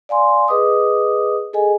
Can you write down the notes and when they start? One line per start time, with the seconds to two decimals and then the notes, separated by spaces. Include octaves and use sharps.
0.09 D5 F5 G#5 C6
0.48 G#4 B4 D#5 D6 D#6
1.53 G#4 A4 D#5 G#5